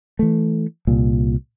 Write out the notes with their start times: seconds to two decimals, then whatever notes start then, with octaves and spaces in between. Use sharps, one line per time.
0.19 E3 A3
0.87 C2 A#2